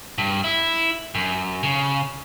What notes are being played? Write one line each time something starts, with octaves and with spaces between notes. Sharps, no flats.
G2
E4
F#2
C#3